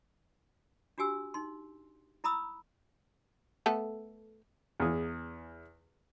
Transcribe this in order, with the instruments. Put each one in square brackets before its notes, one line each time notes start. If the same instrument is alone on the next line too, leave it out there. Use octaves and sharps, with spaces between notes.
[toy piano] D4 F#4 G4 G#5 E6
D#4 C6
E4 A#5 B5 D#6 E6
[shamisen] A3 B3 A4
[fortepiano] E2 G#4